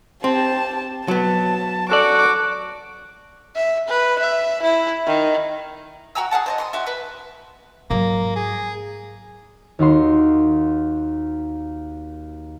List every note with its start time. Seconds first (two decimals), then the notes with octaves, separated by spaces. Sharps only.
0.24 C4 G4 A5
1.08 F#3 B3 A5
1.90 C#4 F#4 A4 D5 D6
3.55 E5
3.88 B4
4.18 E5
4.62 E4
5.06 D#3
6.15 F#4 G5 A#5 E6
6.31 G#4 A#4 F#5 A5
6.46 C5 D5 D#5
6.58 C6 C#6 D#6
6.73 F#4 G4 E5
6.87 B4
7.90 G#2 F#3 A#3
8.36 G#4
9.79 D#2 D#4 F#4 C6